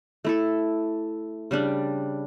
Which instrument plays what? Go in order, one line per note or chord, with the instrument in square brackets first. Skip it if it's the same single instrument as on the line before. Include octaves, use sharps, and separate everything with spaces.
[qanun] A3 E4 A4
C#3 G3 D4